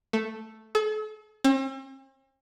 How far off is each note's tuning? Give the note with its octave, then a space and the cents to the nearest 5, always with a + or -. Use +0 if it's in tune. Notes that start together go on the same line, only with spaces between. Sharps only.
A3 +0
A4 -45
C4 +45